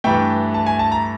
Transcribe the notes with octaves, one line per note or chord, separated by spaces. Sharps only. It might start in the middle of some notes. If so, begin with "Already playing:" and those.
G2 E3 A3 G5
A5
G#5
A5
A#5